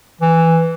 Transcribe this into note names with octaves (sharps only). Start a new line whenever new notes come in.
E3